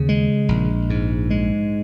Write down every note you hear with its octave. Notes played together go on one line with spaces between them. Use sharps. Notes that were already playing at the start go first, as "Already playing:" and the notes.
Already playing: D#2 C#3
G#3
A#1
G#2
G#3